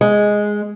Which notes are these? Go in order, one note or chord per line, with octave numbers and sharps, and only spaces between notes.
G#3